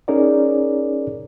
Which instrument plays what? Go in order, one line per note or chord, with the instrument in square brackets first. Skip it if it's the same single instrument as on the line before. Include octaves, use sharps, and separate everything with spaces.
[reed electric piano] C#4 D#4 G#4 A#4 C#5 D5